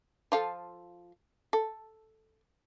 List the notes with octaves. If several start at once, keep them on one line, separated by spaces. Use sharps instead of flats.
F3 F4 A4
A4